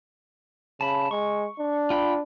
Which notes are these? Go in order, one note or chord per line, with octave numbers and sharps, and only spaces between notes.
C#3 A5 B5
G#3 C#6
D4
F4 G5 B5